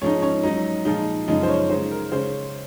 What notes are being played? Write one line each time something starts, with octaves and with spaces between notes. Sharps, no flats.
G#2 F3 G#3 C#4 D#4 C#5
C#4 C#5
G#2 F#3 C#4 D#4 D#5
A#2 F3 G#3 D#4
F#2 C#3 F3 G#3 D#4 D#5
C5
C#4 C#5
C#3 G#3 D#4 C5
A#4
C#3 G#3 C#4 C5